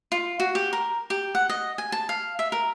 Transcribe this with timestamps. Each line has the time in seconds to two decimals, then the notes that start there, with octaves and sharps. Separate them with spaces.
0.12 F4
0.40 F#4
0.55 G4
0.73 A#4
1.10 G4
1.35 F#5
1.50 D#5
1.78 G#5
1.92 A5
2.09 F5
2.39 E5
2.52 A#4